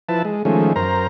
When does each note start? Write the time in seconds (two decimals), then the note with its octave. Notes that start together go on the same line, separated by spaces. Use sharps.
0.09 F3 E4 B4 A5
0.25 G#3
0.45 D#3 F3 G#3 A3 C#4
0.76 F#2 A#4 C5 A#5